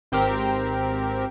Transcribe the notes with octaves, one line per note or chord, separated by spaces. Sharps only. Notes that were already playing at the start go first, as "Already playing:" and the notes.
G#1 C4 G4 A#4